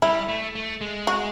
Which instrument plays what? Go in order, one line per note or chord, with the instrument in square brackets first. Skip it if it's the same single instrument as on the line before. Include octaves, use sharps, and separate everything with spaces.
[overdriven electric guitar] G3 [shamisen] E4
[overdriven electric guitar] A3
A3
G#3
[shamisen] F#4